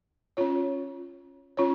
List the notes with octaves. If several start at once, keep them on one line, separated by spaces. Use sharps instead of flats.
C#4 F4 C#5
C#4 F4 C#5